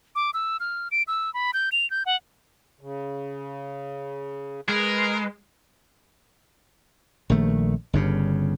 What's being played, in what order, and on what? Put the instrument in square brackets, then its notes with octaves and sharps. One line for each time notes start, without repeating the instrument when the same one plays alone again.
[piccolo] D6
E6
F6
D7
E6
B5
G6
F7
G6
F#5
[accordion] C#3
[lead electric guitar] G#3 [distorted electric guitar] A#4 [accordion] B4
[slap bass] A#1 D#3 A3
G1 G2 C#3